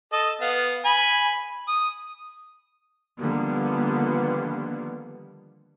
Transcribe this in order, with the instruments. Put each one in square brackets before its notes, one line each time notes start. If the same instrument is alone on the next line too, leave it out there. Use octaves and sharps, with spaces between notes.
[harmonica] A4 D#5
B3 F5
G#5 B5
D#6
[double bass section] D3 D#3 F3 G3 A#3 B3